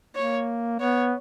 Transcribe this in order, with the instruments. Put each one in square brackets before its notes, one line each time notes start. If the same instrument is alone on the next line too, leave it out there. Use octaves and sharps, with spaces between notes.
[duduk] A#3 [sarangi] C#5
[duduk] B3 [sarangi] C#5